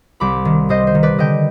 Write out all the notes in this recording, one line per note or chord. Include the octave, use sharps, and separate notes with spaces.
C2 B5 D6
D#3
C3 C5 D#5
C5
D#3
B4 D5
D3 D#5 G5